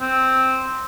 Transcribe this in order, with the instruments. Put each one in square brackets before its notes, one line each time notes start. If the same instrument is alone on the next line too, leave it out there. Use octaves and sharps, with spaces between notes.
[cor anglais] C4